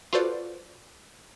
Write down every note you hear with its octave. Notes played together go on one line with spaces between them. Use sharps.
F4 F#4 A4 B4 C5 D5